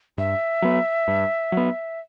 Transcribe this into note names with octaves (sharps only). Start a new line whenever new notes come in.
G2 E5
F#3 B3
G2
F#3 B3